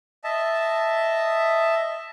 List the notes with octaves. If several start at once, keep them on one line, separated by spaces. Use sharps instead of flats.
D#5 E5 A5